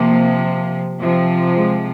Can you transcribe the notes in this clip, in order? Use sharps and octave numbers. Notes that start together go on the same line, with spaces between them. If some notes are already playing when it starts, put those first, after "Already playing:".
Already playing: C3 F3 A#3
C3 F3
G#3